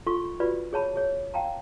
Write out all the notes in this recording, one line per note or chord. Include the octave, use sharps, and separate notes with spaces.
F4 A4 C6 C#6
F4 F#4 B4 D5 B5
G#4 C#5 A5 B5
G#4 C#5
F5 G5 A5 A#5